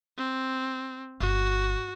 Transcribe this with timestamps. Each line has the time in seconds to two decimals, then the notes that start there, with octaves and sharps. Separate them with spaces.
0.18 C4
1.20 G1 F#4